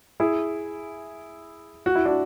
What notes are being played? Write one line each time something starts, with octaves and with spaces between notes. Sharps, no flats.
E4 G#4
F#4
E4
D4 F#4